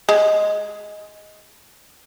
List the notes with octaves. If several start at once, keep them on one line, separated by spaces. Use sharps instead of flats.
G#3